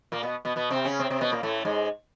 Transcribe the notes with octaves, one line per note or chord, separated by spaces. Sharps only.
A#2 A#3
B2 B3
B2 B3
B2 B3
C3 C4
C#3 C#4
C3 C4
C3 C4
B2 B3
A#2 A#3
A2 A3
G#2 G#3